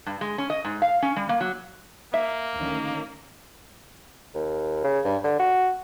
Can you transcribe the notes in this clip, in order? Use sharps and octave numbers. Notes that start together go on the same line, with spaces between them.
G2
G#3
C#4
D#5
G#2
F5
C#4
G3
A#3
F#3
A#3 E5
D2 D#3 C#4
D#2
C#3
G2
D3
F#4